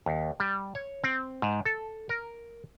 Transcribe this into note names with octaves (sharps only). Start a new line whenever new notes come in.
D#2
G3
C#5
C4
G#2
A4
A#4